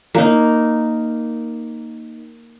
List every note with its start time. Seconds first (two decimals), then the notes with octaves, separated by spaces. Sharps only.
0.15 A#3 D#4